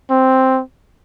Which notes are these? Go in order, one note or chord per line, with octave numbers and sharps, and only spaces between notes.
C4